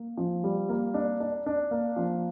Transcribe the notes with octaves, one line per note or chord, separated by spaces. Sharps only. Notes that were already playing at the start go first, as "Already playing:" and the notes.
Already playing: A#3
F3
G3
A#3
D4
D4
D4
A#3
F3